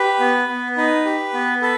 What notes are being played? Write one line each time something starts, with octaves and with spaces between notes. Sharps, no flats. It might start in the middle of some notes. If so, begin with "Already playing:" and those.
Already playing: G4 B4
B3
B3
D#4 B4
G4
B3
A4 B4